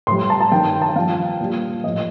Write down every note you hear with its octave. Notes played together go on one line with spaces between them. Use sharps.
A2 G3 C6
A5
A5
G2 D#3 G3 G5
A5
G5
G2 F3 F5
A#2 G3
A2 F3 D#5